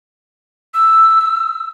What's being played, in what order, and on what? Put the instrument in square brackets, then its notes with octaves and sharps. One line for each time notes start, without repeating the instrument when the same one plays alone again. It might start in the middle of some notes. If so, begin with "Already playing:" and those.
[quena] E6